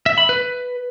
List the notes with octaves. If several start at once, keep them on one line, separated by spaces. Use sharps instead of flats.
E5
B5
B4